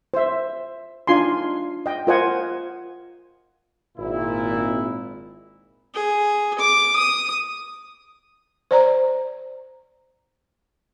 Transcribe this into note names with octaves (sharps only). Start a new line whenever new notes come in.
C5 E5
D4 D#4 F4 G#5 C6
D#5 G5
F4 A#4 C5 D#5 F#5 G#5
G#1 A#2 E4
G#4
D6
D#6
C5 D5 A#5